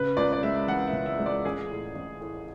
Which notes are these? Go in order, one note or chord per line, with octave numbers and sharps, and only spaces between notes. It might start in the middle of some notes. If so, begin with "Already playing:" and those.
Already playing: C#3 B4
C#2 D5
D5
G#3 E5
E3 F#5
E5
C#3
E5
G#3
D5
A1 G#4
A2
A1
A2